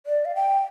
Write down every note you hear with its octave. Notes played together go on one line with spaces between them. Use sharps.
D5
F5
G5